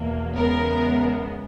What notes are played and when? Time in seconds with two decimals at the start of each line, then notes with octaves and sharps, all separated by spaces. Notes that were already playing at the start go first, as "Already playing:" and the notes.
Already playing: E2 B2 A#3
0.35 E2 C#3 G#3 B3 A#4